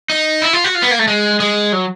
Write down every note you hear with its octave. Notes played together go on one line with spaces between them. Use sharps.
D#4
E4
F4
F#4
F4
B3
A#3
A3
G#3
G#3
F#3